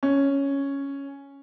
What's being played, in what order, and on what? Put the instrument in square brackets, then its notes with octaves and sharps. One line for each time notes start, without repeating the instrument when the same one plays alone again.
[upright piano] C#4